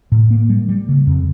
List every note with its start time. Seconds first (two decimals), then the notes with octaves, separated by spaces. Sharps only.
0.12 A2
0.31 A#3
0.49 G3
0.69 G3
0.89 C#3
1.07 F2